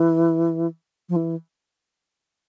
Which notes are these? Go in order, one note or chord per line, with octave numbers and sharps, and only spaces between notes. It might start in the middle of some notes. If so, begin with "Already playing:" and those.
Already playing: E3
F3
E3